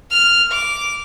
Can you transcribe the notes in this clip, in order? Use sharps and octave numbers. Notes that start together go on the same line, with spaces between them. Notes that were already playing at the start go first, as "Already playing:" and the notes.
F6
D6